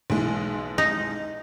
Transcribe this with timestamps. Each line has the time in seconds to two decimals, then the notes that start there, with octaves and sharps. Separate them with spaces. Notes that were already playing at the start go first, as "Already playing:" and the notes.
0.10 B1 E3 G#3
0.78 D#4